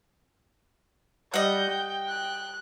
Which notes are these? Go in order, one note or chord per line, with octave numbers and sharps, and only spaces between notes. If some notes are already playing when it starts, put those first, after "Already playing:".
G3 D#5 F#5 G6
G5
F#6